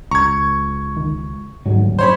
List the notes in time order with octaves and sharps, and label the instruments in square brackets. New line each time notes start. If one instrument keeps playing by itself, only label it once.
[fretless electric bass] C#2 [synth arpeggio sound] A#5 [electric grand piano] C#6 G#6
[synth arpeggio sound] D#3
[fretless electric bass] D#1 D2 F#3 [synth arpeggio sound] G#2
[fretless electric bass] F#2 [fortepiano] C5 C#5 B5